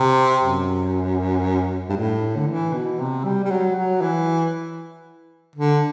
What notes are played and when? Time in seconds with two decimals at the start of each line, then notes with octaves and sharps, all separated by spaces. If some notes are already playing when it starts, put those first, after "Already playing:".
Already playing: C3
0.43 F#2
1.89 G2
1.97 A2
2.36 D3
2.47 E3
2.74 B2
2.99 C3
3.24 G3
3.44 G3
3.50 F#3
3.75 F#3
4.01 E3
5.56 D3